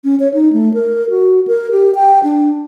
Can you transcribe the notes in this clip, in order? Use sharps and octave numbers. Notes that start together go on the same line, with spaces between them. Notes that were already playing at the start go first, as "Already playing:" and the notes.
C#4
C#5
D#4
A3
A#4
F#4
A#4
G4
G5
D4